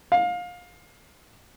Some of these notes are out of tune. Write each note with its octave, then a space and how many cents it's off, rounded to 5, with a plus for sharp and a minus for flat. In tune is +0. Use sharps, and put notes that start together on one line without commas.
F5 +25